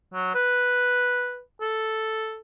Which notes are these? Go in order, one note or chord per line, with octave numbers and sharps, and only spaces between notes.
F#3
B4
A4